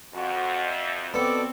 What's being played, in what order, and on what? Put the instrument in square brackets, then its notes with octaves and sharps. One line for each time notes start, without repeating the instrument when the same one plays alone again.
[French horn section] F2 [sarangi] F#4
[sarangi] E5
[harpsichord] B2 [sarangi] C4 [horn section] A4 D5